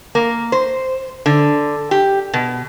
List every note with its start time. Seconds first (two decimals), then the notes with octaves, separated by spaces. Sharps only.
0.15 A#3
0.52 C5
1.26 D3
1.91 G4
2.34 B2